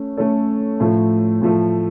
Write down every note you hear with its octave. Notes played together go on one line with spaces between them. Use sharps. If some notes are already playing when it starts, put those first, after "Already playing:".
Already playing: A3 C#4 C#5
A3 C#4 A4 C#5
A2 F3 A3
A2 F3 A3